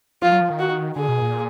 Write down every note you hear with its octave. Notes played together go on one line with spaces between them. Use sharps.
F3 F4
F#3
F3
D#3
F#4
D3 G#4
B2
A#2